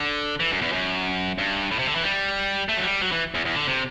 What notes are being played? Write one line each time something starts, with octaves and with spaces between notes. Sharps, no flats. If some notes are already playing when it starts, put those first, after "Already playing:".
Already playing: D3
E3
F#2
E2
F#2
G2
A2
C3
D3
E3
G3
A3
F#3
G3
F#3
E3
E2
E2
D3
C3